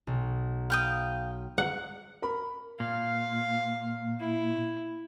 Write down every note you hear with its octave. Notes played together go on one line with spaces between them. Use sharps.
B1
F5 G5 B5 D#6
F#5
A#4 B5
A#2 F5
E4